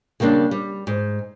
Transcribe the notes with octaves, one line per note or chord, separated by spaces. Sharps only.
C#3 G3 A#3 C#4 D4
G3
G#2